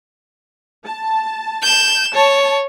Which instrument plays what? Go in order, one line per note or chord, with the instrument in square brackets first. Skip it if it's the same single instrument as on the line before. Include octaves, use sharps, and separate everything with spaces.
[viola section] A5
[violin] G6 E7
[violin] C#5 [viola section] A5